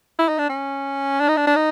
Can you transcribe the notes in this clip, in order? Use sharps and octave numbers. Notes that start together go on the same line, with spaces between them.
E4
D#4
D4
C#4
D4
D#4
D4
D4
D#4